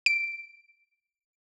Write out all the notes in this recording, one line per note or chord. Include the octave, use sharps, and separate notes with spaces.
D7